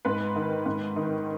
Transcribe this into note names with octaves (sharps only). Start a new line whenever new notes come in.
G#2 B4
D#3
G#2
D#3